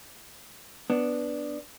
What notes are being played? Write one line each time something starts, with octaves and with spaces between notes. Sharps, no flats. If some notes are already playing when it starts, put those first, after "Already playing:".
B3 D4